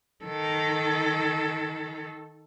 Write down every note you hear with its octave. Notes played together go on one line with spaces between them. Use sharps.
D#3 A4